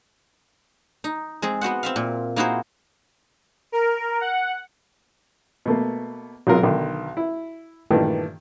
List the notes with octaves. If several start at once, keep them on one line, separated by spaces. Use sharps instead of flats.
D#4
G#3 C4 G#4
B3 F#4 C5 F#5
C4 E5 F5
A#2
A#3 D#4 E4 F#4 G#4 C5
A#4
F#5
B2 A3 A#3
B1 C3 F#3 G#3 F4 A#4
B1 D3 D#3
E4
G2 A#2 D#3 E3 A3